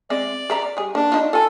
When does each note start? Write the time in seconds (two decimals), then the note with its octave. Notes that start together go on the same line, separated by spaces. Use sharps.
0.10 G#3 C4 D5 E5
0.50 G#4 E5 A#5
0.77 G3 G#4
0.95 A#3 D4
1.12 D#4 F4
1.33 F4 A4 G#5